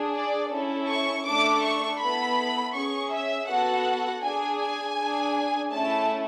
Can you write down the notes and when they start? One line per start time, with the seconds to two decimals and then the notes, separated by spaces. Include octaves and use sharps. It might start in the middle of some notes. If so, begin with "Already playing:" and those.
Already playing: D4 G#4
0.15 D5
0.52 C#4 E4 A4
0.89 C#6
1.26 A3 D4 A4 D6
1.63 C#6
2.01 B3 E4 A4 B5
2.75 C#4 G#4 C#6
3.13 E5
3.50 B3 F#4 A4 F#5
4.24 D4 G#4 G#5
4.61 G#5
4.98 D4 G#4
5.73 A3 C#4 E4 A5